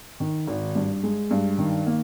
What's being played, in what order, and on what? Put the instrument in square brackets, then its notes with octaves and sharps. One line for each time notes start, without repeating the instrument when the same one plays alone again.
[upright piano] D#3
G#1
G2
G#3
G2
D#3
A#3